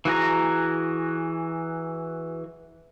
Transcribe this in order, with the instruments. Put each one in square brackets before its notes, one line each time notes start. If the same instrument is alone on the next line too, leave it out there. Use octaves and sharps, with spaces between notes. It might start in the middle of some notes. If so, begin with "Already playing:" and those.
[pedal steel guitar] E3 F#4 G#4 A#5